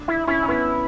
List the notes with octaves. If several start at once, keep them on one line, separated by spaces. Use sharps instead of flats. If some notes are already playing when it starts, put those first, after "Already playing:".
Already playing: D4
E4
C#4 E4
C#4
B3 E4